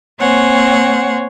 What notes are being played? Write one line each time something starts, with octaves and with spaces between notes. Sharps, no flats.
A#3 C4 C5 C#5 F#5 G#5